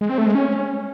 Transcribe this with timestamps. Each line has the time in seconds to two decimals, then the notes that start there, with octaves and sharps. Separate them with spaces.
0.01 G#3
0.09 C4
0.18 A3
0.26 G#3
0.35 C#4